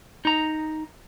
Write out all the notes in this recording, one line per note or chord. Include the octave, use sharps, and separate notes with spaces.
D#4 A#5